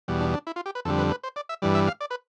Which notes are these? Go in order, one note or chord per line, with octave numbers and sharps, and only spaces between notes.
E2 B2 G3
D4
D4
E4
F4
G4
B4
F2 D3 G3 A4
B4
B4
C5
D5
E5
G2 E3 G3 D5
E5
F5
D5
B4